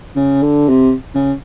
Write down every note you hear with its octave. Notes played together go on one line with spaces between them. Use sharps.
C#3
D3
C3
C#3